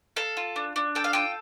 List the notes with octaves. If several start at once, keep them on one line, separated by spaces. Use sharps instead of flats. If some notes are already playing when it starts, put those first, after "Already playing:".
A4 F5
F4
D4
D4
A4 G5
F5
F4 G5